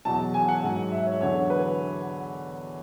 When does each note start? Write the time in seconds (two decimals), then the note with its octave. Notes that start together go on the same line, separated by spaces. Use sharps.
0.05 E2 B2 F#3 A5
0.34 G#5
0.48 F#5
0.63 G#2 F#3
0.92 E5
1.07 C#5
1.21 E2 D3 F#3 C#5
1.50 B4